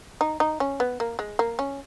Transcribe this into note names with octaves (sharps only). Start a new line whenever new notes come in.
D#4
D#4
C#4
B3
A#3
G#3
A#3
C#4